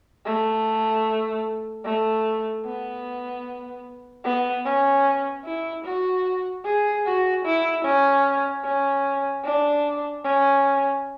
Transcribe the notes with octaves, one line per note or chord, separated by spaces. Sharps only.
A3
A3
B3
B3
C#4
E4
F#4
G#4
F#4
E4
C#4
C#4
D4
C#4